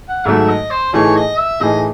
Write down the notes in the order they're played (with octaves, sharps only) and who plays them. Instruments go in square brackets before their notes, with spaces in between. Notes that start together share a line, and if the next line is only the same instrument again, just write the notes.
[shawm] F#5
[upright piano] G#2 D#3 F#3 A3 [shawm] E5
[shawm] D#5
C5
[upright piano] A2 E3 A3 D#4 G#4 [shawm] C#5
[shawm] D#5
E5
[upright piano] A2 E3 A3 D#4 G#4 [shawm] D#5